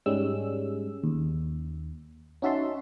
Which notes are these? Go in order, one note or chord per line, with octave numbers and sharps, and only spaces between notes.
G#2 G3 G#3 C#4 E6
D#2
C#4 D#4 F#4 E5 A5 C6